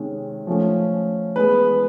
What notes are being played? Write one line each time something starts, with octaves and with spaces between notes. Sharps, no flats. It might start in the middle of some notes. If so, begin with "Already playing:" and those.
Already playing: C3 D#3 G#3 C#4
F3 A3 C#4
E3 G#3 B3 B4